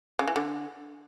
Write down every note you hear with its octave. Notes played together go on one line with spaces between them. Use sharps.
C#3
E3
D3